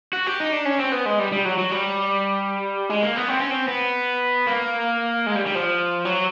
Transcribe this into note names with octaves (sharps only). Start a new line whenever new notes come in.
F#4
G4
D#4
D4
C#4
C4
B3
G#3
G3
G3
F#3
F#3
G3
G#3
A#3
B3
C4
C#4
C4
B3
A#3
G#3
G3
G3
F3
F#3